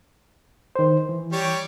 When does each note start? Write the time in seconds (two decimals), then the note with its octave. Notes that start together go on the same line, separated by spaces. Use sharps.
0.76 D#3 C5
1.09 E3
1.32 G3 G4 C#5